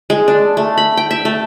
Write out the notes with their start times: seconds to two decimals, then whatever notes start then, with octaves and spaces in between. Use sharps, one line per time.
0.10 G#3
0.28 D4
0.57 A3
0.78 B5
0.97 G5
1.11 E5
1.25 A3